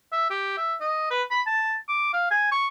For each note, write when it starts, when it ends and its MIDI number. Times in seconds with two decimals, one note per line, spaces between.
0.12 0.30 76
0.30 0.54 67
0.57 0.74 76
0.81 1.10 75
1.10 1.23 71
1.31 1.41 83
1.47 1.75 81
1.89 2.12 86
2.13 2.31 77
2.31 2.47 80
2.51 2.68 85